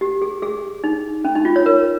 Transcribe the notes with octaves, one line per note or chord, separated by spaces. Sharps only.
G4
G#4
G#4
D#4
C#4
D#4
F4
C#5
A#4